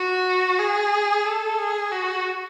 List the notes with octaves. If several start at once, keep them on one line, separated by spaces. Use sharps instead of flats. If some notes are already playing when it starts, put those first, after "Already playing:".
Already playing: F#4
G#4
A4
G#4
F#4